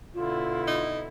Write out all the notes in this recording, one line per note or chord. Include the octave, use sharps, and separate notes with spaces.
B2 D3 E4 F4
D#4